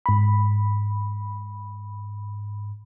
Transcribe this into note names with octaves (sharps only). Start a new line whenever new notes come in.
G#2 B5